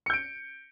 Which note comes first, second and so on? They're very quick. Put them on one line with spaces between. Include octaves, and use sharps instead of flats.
C#7 G6 D7